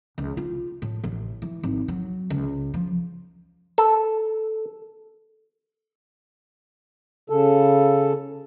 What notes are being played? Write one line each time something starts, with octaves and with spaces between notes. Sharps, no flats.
C#2
F4
A2
A1
E3
G#1
F#3
C#2
F3
A4
C#3 A4